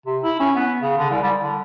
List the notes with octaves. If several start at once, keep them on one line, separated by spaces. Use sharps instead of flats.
C3
E4
C#4
B3
C#3
D3
C2
G3
D3